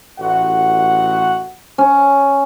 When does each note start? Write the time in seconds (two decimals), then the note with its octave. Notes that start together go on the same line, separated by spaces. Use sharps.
0.19 A1 F#4 F#5
1.78 C#4